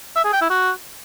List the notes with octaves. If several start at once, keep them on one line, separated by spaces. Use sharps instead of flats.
E5
G#4
G5
E4
F#4